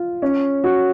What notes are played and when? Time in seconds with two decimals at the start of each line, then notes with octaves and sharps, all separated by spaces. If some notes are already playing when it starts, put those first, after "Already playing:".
Already playing: F4
0.22 C#4
0.64 F#4